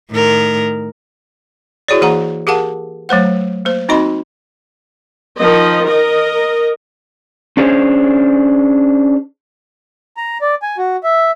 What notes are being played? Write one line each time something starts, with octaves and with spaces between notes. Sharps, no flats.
A2 D#3 A#4
E4 F#4 G#4 C#5 D5
E3 A#3 G#4 F#5 A#5
G4 G#4 A#4 F5 F#5 A5
F#3 A3 C5 F#5
A#3 C5
C4 D#4 F#4 D#5 B5 C6
D#3 F3 D#5
A#4 D#5
C#4 D4 G#4 A4 C5 C#5
A#5
D5
G#5
F#4
E5